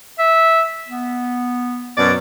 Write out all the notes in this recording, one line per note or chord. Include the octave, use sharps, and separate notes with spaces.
E5
B3
F#2 B2 D5